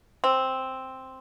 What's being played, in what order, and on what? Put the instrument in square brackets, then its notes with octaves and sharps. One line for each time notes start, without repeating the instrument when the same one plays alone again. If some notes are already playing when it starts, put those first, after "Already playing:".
[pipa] C4